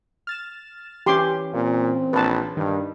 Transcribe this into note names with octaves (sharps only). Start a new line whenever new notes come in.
F6 A6 E7
E3 C#4 G4 C6 D6
A#2 C4
A#1 B4 A5
G2 D#3